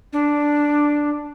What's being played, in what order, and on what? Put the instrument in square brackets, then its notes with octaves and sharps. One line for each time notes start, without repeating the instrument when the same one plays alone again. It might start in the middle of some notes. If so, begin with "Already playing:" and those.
[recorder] D4